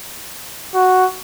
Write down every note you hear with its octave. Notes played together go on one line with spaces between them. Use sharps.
F#4